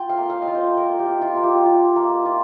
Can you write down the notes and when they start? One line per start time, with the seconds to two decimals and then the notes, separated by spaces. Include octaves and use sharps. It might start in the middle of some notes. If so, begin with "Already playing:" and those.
Already playing: F4 G5
0.09 F5
0.17 A#3
0.30 F5
0.42 D#5
0.47 F4
0.55 C5
0.77 A#3 A#4
0.99 G4
1.07 F4
1.22 F4
1.36 A#3
1.43 G4
1.66 F4
1.96 A#3
2.26 F4